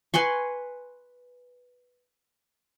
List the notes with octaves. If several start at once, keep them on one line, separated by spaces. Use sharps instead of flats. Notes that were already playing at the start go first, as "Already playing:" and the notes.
B4 G#5 C6 C#6